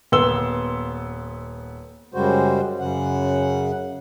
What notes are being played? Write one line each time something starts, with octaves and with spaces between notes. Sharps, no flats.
D#1 B3 C6 E6 G7
F#2 C#3 G3 G#3 F#4 C5
F#2 C#3 F#5